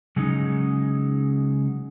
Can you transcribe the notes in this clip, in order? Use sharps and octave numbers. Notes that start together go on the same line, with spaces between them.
C#3 F#3 G#3 C#4 D#4